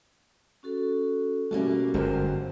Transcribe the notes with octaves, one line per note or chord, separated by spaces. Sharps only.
C#4 F#4 A4
B2 G3 A3 A#3 C#4 F#4
G1 F#2 G#3 A#4 C5